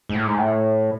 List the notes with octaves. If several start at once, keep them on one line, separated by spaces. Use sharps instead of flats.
G#2
A2
G#2
A2